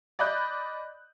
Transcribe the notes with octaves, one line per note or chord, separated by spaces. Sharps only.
D5 D#5 B5 F#6 G6